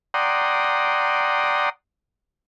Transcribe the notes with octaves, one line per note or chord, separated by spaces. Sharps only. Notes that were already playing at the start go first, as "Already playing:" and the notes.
D5 F#5 G5 A#5 C6 D#6